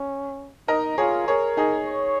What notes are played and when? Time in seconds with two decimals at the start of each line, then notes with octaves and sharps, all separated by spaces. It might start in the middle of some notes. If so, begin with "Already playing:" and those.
Already playing: C#4
0.68 D#4 A#4 D#5
0.98 F4 G#4 C#5
1.28 G#4 A#4 C#5
1.57 D#4 G#4
1.88 C#5